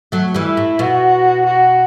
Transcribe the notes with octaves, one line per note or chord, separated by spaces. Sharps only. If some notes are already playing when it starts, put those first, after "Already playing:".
F#3 A3
E3 G3
E4
A2
B2 F#4
F#4